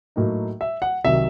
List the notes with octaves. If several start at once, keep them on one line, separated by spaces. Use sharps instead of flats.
A2 F#3 A#3 D#4
E5
F#5
C2 C3 D#3 F#3 E5